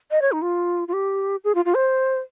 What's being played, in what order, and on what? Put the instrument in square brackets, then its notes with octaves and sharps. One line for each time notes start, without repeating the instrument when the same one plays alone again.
[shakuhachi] D#5
C#5
D#4
F4
F4
G4
G#4
F4
F4
C5